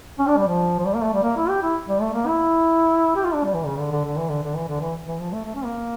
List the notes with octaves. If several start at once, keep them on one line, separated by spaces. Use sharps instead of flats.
C#4
D4
G3
F3
F3
G3
A#3
A3
G3
A#3
E4
G4
E4
G3
A3
A#3
E4
G4
F4
D4
G3
E3
C#3
D3
D3
D3
E3
D3
D3
E3
D3
E3
E3
F3
A3
A3
C#4
A#3